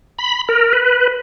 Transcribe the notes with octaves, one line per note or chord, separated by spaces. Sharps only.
B5
A#4
B4